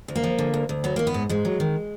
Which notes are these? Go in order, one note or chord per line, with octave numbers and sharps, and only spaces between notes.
D2
A#3
F3
D3
D2
D2
F#3 B3
D#3 A#3
B3
G#2
G#2 G#3
F#3
D#3